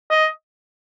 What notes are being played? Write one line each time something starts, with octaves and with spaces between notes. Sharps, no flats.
D#5